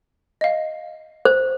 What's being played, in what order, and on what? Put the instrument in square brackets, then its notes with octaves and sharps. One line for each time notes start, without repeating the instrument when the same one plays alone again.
[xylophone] D#5 F5
[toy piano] C5